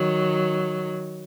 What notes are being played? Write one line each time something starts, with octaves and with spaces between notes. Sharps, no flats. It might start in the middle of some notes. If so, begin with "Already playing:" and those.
Already playing: D#3 F#3